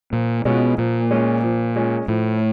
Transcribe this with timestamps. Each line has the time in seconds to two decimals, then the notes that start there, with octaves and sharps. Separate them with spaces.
0.13 A#2 F3
0.45 B2 G#3 C#4 F4
0.78 A#2 F3
1.11 G#3 C#4 F4
1.43 F3
1.76 G#3 C#4 F4
2.08 A2 F3